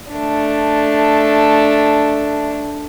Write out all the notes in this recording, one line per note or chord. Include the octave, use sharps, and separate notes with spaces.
A3 D4